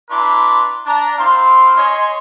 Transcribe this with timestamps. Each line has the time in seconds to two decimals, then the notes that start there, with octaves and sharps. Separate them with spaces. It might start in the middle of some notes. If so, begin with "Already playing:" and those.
0.10 D4 E4 B4 A#5 C6 D6
0.86 D4 A#5
1.18 C4 E4 F5 C6
1.77 C#5 D#5 G#5 C6